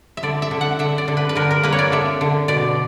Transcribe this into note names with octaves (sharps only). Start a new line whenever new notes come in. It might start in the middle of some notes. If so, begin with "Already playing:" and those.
E5
D3 D5
E5
D3
F#5
D3 E5
D5
D3
B4
B4
D3 A#4
A#4
A#3 B4
C#5
D5
D3 E5
D3
B2 D5